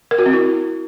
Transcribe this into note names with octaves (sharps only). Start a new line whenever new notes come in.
A#4
F#4
C4
E4